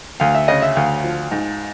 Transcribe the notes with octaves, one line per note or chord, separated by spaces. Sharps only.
D2 F5
E5
C#3 D#5
E5
D2 F5
F3
G#2